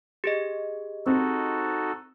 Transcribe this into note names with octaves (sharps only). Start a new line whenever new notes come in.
G4 G#4 D#5
C4 D#4 F#4 A4